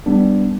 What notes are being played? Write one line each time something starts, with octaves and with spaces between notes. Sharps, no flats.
G3 B3 D4